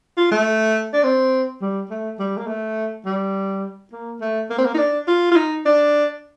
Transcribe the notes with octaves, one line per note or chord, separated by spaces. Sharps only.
F4
A3
D4
C4
G3
A3
G3
A#3
A3
G3
A#3
A3
A#3
C4
A#3
D#4
D4
F4
F4
D#4
D4